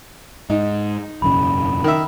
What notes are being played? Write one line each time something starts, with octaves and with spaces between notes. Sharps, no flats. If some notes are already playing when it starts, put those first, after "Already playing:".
G#2 D#4
E1 F#2 C#3 B5
D#3 E5